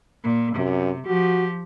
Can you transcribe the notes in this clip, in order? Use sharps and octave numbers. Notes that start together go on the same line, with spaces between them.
A#2
F#2 C3
F3 F#4 G4